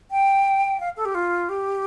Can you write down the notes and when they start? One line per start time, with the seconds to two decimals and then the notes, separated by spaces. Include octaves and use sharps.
0.11 G5
0.80 F5
0.97 A4
1.05 G4
1.15 F4
1.49 G4